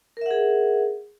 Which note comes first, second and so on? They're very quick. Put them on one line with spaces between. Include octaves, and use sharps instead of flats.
A#4 E5 F#5 G#4